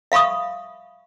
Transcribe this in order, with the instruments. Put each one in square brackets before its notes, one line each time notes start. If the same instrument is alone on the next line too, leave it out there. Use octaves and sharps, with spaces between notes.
[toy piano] E5 F5 B5 C#6 D#6